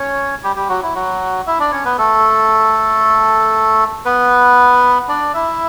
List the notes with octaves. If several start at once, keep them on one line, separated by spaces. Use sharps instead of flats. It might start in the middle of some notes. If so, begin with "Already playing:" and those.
Already playing: C#4 C#5
G3 G4
G3 G4
F#3 F#4
E4
F#3 F#4
E4 E5
D4 D5
C#4 C#5
B3 B4
A3 A4
B3 B4
D4 D5
E4 E5